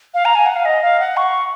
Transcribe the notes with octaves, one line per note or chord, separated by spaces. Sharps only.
F5
A#5
G#5
F#5
F5
D#5
F5
F#5
C#6